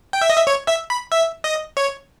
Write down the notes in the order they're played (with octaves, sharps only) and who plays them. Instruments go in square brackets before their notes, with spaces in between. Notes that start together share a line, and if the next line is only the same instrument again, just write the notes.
[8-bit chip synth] G5
E5
D#5
E5
C#5
E5
B5
E5
D#5
C#5